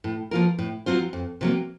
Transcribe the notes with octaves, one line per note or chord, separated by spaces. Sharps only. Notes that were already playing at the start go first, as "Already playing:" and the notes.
A2
F3 A#3 F4 A#4
A2
F#3 C4 F4 C5
F2
C3 F#3 A#3